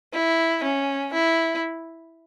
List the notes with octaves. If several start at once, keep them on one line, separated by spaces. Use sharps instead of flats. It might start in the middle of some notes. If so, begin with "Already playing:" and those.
E4
C#4
E4